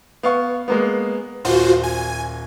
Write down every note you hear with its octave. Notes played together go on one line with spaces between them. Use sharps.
B3 F5 C#6
G#3 A#3 B3
D#1 F4 F#4 C5
G#5